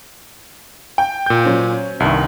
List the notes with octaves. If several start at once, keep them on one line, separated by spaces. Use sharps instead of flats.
G5
A#2 G6
F#3 C#4 C5
C2 G2 D#3 E5